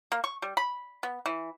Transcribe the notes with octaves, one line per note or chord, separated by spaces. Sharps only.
A#3
C#6
G3
B5
B3
E3